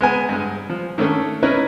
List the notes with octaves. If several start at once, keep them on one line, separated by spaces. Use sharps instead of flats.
G#3 B3 G#5
G2 G#3
F3
D#3 A3 C#4 D4 A4
C#4 D#4 E4 A#4 B4 C#5